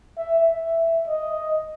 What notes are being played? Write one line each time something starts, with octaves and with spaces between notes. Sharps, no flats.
E5
E5
D#5